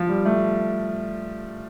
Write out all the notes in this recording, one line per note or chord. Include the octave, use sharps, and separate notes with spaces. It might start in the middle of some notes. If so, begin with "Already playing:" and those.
Already playing: F3
G3
A3